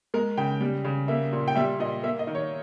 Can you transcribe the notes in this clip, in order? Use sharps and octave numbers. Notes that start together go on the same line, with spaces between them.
G#3 A#4
C#3 G5
G3
C#3
A#3 E5
A#2
G5
G3 E5
A#2 D#5
A#3 E5
D#5
D#3
C#5